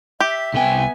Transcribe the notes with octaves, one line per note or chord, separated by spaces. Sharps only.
G4 E5
C2 B3 G5 G#5